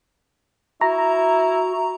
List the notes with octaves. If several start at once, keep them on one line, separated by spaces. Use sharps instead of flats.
E4 F#4 A#5